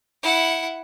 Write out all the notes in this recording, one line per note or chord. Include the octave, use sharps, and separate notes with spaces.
E4 F#5